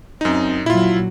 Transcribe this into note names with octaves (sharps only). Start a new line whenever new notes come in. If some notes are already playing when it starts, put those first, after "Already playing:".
F#2 C4 D#4
A#2 F#3 E4 F4